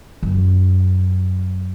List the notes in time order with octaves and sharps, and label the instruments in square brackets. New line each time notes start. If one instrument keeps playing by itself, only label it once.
[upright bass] F#2